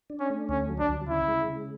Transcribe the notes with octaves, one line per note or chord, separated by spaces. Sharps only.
D4
C#4
A3
D2 C#4
F#3
D4
D2
C#3 E4
G#3
C#3